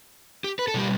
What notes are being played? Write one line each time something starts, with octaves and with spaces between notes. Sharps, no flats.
G4
B4
A4
B2 G3 G4